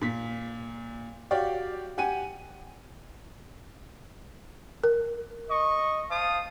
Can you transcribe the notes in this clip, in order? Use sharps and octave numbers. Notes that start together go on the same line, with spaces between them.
A#2 B6
F#4 G4 D5 F5
G4 F#5 G#5 D#7
A#4
D#5 C#6
C5 F5 A5 D#6